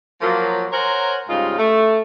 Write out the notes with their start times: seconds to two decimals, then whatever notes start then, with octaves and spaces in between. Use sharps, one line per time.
0.22 F3 F#3 A#3
0.73 A#4 C5 C#5 F#5 G#5 A#5
1.29 G#2 C#3 G3 D#4 F4
1.59 A3